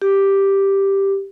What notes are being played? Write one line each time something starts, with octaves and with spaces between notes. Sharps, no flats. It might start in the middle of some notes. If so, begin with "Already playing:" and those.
G4